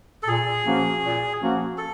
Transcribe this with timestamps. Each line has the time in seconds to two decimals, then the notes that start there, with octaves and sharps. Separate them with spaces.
0.23 A4
0.28 A#2 G#4
0.66 F3 A#3 C#4 F#4
1.04 A#2
1.41 F3 A#3 C#4 F#4
1.78 A4